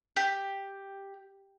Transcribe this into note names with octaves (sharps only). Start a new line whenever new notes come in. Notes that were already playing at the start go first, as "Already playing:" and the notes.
G4